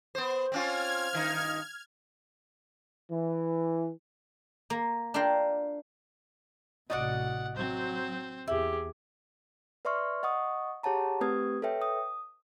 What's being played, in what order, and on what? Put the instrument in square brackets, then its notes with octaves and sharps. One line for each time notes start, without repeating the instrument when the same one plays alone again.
[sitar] B3 C5
[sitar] C4 C#4 F4 [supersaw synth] F6 G#6
[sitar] G2 D#3 D#4
[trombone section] E3
[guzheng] A#3
D4 F4 A#4 F5 G5
[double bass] A1 C3 [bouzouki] F#4 D5 D#5 [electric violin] F#5
[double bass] F#3 [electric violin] C4 C5
[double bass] E2 [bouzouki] E4 [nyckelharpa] G4 G#4
[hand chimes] B4 D5 E5 C6 C#6 F6
D#5 F#5 C#6 D#6
G4 G#4 C#5 F#5 A5 A#5
A3 C4 G4 B4 D#6 G#6
A4 B4 C#5 E5 G5
D#6